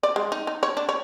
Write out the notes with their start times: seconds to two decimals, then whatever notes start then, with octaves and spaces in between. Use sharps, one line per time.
0.03 D5
0.16 G#3
0.32 D#4
0.47 D#4
0.63 C#5
0.77 D4
0.89 C#5